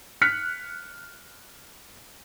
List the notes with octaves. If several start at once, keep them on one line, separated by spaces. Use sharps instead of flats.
F6 F#6 B6 C#7